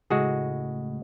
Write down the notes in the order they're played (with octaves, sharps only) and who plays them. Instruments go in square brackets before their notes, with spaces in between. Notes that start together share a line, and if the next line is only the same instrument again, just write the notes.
[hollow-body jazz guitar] C#2 A2 A3 [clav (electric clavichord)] G#3 F#4 G#4